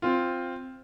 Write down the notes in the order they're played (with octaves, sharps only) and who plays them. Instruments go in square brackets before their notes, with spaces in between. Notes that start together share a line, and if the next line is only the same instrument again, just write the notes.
[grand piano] C4 F4